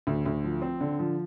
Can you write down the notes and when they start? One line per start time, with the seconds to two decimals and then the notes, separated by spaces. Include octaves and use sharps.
0.07 D2
0.26 D2
0.44 F3
0.62 C4
0.81 D3
0.99 F3